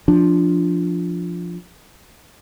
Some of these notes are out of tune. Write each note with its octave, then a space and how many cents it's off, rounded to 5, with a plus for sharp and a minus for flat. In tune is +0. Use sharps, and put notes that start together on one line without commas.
F3 +0 D4 +0